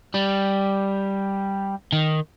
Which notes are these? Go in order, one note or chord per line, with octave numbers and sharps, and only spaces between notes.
G3
D#3